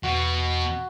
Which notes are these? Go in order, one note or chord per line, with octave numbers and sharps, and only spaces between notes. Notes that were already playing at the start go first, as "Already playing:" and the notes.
E2 B2 F#4